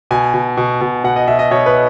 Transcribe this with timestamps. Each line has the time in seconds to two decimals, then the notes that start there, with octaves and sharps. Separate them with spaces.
0.11 B2 G#5
0.34 B2
0.57 B2
0.81 B2
1.04 B2 F#5
1.16 D#5
1.27 B2 E5
1.39 D#5
1.51 B2 C#5
1.66 B4